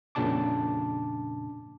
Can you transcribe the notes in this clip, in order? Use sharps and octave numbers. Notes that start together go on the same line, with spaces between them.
F2 A#2 C#3 D4 A5 D6